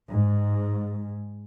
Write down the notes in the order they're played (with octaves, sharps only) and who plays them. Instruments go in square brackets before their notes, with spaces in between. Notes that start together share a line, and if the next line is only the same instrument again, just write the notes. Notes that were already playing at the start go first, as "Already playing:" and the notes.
[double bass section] G#2